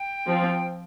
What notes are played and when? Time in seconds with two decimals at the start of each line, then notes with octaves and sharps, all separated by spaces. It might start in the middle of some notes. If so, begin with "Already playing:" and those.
Already playing: G5
0.28 F3 C4 F4